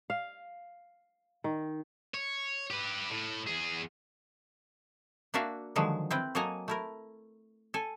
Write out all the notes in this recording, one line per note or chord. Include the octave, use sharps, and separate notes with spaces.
F5
D#3
C#5
G4 B4
A2
E2 G#4
A#3 D4 F#4 D5 E5 F5
D3 D#3 F3 F#3 G#3
C4 E4 B4 G5
F#3 A#3 A4 D#5 G#5 A#5
A3 E4 A#4
A4 G#5